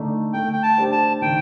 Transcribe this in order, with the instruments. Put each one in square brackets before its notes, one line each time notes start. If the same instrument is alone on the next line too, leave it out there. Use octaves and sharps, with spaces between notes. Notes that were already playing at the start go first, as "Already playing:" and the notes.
Already playing: [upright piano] D3 A3 D#4 A4 D5
[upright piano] A3 [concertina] G5
[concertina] G5
A5
[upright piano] D4 G4 C5
[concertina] A5
[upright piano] D#3 [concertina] G5